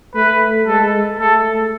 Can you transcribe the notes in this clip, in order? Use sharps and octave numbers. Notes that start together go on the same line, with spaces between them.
A3 B4
G#3 A4
A3 A4